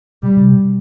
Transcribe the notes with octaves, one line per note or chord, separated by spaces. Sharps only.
B2 G3
C3
B2